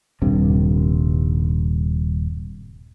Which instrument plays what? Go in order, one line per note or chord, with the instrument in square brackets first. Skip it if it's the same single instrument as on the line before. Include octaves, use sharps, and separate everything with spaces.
[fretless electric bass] D#1 G2 C3